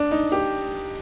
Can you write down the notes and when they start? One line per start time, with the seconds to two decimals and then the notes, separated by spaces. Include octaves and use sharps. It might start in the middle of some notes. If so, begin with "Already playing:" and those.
Already playing: D4
0.11 D#4
0.32 G4